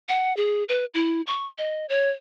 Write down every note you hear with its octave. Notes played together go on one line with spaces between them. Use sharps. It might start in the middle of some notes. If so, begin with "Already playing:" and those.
F#5
G#4
B4
E4
C#6
D#5
C#5